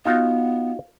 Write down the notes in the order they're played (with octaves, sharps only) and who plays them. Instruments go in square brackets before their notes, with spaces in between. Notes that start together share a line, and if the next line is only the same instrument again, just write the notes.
[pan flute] B3 [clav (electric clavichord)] D#4 F4 F#4 [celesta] F5